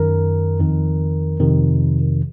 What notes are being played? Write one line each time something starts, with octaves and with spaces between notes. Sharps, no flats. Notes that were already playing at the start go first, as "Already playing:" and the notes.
Already playing: F#2 D#3 A#4
F2 D#3
F2 C3 D#3